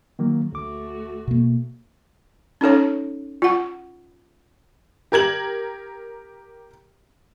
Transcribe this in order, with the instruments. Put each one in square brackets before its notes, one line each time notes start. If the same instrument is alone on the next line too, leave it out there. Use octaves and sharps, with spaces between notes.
[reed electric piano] D#3 F#3 A#3
[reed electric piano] D2 D6 [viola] A3 F#4
[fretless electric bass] B2 A#3
[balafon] C#4 D#4 A4 C#5
F4 F#5
[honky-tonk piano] G4 A#4 G#6 F#7